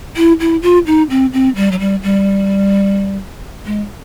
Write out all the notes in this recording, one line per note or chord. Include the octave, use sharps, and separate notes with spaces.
E4
E4
F4
D#4
C4
C4
G3
F#3
G3
G3
G#3